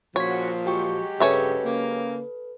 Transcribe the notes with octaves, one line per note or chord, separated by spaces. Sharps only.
A#2 C#3 F3 C#4 F#4 C#5 C6 B6
F#3 G#3 F#4 G4 G5 C#6
G2 C#3 C#4 A4 B4 C#5 E5
C#3 A#3